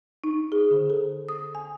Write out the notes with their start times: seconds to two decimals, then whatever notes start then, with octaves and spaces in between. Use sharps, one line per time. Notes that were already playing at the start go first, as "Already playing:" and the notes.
0.24 D#4
0.52 G#4
0.71 D3
0.90 A4
1.29 D#6
1.55 G#5